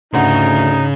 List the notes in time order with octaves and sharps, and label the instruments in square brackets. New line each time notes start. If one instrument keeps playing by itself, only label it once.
[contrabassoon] D2 [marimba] G#2 F#5 [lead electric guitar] C#3 [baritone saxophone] D#4